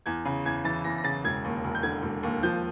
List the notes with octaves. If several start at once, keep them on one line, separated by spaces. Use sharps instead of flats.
E2 G#6
C#3
E2 G#6
E3 A6
E2 A#6
A#6
C#3 A6
E1 G#6
D#2
E1
G6
D3 G#6
E1
D#2
F3 G6